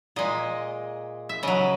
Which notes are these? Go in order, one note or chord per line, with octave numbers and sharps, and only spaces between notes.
A#2 G#3 D#5
E5
C#3 F#3 D#5